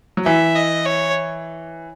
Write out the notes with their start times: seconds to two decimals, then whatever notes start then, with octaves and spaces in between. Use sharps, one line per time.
0.17 F#3
0.26 E3 E5
0.55 D#5
0.85 C#5